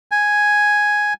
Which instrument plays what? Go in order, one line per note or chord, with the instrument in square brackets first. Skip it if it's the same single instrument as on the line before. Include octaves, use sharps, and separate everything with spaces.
[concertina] G#5